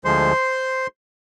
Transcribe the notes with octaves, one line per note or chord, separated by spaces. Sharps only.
D2 D3 F3 G#3 C5 C6